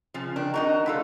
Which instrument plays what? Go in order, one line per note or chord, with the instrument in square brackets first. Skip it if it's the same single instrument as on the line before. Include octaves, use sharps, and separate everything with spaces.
[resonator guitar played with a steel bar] C#3 F3
[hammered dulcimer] D#3 [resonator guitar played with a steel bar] D4
[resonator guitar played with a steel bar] D4 D#4 A#4 [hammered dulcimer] F#4 A5
[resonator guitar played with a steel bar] A3 F4 A4 [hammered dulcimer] B5